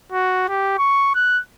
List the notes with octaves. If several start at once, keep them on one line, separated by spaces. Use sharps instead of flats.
F#4
G4
C#6
F#6